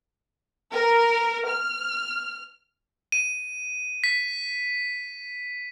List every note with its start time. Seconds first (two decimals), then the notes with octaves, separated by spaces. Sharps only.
0.73 A#4
1.49 F6
3.12 D#7
4.04 B6